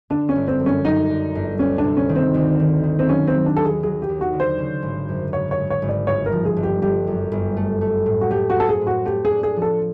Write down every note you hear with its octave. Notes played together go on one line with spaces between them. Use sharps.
D3 D4
C#4
G1
C4
F#2
C#4
F#2 D#4
D3
G1
D2 C#4
D4
C3
C#4
D#3
C4
D2
D#3
D#3
C4
F#3 C#4
C4
F#3
D4
D#2 A4
G#4
F#3 G#4
G4
D#2
F#4
D3
C5
C#3
G#1
F#2
G#1 C#5
C#5
G#1
C#5
G#1
D5
G1 C#5
A#4
F3
G#4
G1
G4
G1 G4
F#2
G1
A3
A3
A2
F#4
A3 G4
F#4
C4 A4
G#4
A2
F#4
A3 G4
G#4
D4
G#4
F3
A4